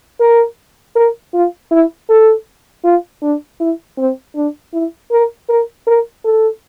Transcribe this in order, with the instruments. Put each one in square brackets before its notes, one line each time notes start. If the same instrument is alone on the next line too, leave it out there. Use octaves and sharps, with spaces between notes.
[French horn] A#4
A#4
F4
E4
A4
F4
D4
E4
C4
D4
E4
A#4
A#4
A#4
A4